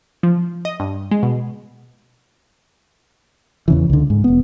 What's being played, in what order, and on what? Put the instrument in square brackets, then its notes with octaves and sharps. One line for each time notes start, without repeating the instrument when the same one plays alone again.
[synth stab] F3
D#5
G2
G#3
B2
[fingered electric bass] E2 C#3 E3
C#2 D3
G#2
E1 B3